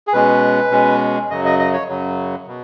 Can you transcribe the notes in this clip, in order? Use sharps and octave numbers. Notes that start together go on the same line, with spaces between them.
G#4
B2 G#3 C#4 B4
B2 G#3 C#4
F#2 C#3 F#3 D#5
D#5
D#5
C#5
F#2 C#3 F#3
B2